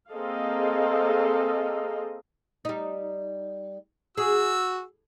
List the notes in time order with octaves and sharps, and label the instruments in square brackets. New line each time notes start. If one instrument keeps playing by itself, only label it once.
[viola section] A#3 C4 G#4 A4 D#5 F5
[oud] G3 D#4
[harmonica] F#4 E6 [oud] G#4